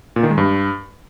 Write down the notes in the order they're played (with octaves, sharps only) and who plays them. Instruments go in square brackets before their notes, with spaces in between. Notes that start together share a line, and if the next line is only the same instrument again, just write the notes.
[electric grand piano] A#2
D#3
G#3
G2